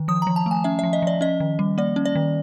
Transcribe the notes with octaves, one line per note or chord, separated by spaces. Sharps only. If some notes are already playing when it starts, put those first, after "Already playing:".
Already playing: D#3
F3 D#6
F3 A#5
A5
A3 G#5
C#4 E5
F3 E5
D#5
F3 D5
C#4 D#5
D#3
G3
A#3 D5
C#4
D5
D#3